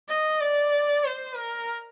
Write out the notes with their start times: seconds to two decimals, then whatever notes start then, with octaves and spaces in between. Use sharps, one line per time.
0.09 D#5
0.41 D5
1.05 C5
1.37 A#4